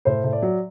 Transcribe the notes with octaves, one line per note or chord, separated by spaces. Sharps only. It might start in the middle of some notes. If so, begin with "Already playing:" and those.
A2 C5
A2
D5
F#3